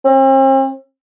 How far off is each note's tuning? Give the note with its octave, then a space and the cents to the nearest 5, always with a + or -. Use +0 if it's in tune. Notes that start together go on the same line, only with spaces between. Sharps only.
C4 +40